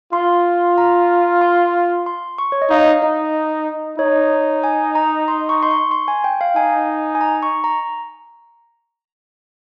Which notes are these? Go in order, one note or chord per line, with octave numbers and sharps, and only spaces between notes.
F4 C6
A#5
C6
C6
C#6
C#5
D#5
D#4 F5
D#4 D#5
D#4 C#5
G#5
A#5
C6
C#6
C6
C#6
C6
G#5
G5
F5
D#4 G#5
G#5
A#5
C#6
A#5